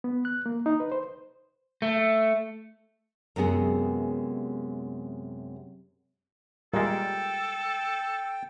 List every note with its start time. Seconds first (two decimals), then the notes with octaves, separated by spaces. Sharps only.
0.04 B3
0.25 F#6
0.46 A#3
0.66 D#4
0.80 B4
0.92 C5
1.82 A3
3.36 F#2 C3 G#3 B3 G#4 F#5
6.74 A#2 G3 G#3 A4 A#4 D5 G5